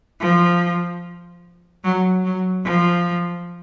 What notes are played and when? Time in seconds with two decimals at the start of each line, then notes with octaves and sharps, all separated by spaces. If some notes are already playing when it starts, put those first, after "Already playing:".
0.20 F3
1.84 F#3
2.25 F#3
2.65 F3